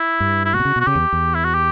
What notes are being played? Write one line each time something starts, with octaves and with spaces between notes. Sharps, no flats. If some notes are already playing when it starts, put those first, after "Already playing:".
Already playing: E4
G2
E4
A#2 F#4
B2
C#3
B2 F#4
C#3 G4
E2
E2
E4
F#4
G4